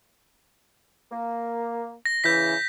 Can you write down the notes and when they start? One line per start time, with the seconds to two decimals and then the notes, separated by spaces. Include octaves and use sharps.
1.12 A#3
2.06 A#6
2.24 E2 C#3 E3 G6 B6